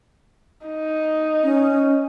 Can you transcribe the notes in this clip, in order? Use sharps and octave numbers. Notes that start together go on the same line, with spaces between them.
D#4
C#4